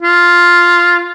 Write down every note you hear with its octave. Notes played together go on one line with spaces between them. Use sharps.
F4